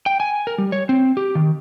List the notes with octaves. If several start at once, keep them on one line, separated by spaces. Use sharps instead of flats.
G5
G#5
A#4
G3
C#5
C4
G4
D#3